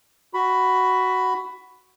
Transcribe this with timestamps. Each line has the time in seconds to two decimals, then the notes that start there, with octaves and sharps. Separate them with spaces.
0.34 F#4 B5